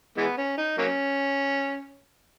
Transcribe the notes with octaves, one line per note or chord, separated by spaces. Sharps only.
E3 G#3 B3
C#4
D#4
F#3 A#3 C#4